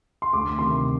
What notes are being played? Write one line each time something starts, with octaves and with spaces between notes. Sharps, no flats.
C6
D2 D6
C3 D#3 A3 C6